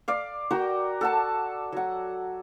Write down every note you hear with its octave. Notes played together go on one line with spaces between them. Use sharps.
D5 F5
F#4 A#4 G5 A#5
A4 F#5 A5
F#3 F#5